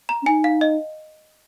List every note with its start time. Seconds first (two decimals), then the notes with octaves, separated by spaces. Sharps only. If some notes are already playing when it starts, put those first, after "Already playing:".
0.09 A#5
0.22 C#4
0.26 D#4 G#5
0.44 F5
0.61 D#5